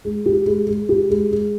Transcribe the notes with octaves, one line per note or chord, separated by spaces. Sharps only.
G#3
G4
G#3
G#3
G4
G#3
G#3